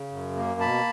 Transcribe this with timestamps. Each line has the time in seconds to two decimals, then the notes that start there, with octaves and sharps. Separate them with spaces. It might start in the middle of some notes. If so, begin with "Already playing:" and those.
Already playing: C#3
0.11 F#2
0.35 A#3
0.60 B2 A5 B5